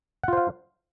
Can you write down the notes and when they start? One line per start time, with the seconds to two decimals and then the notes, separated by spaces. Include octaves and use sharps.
0.24 F#5
0.28 F4
0.33 C5
0.37 F5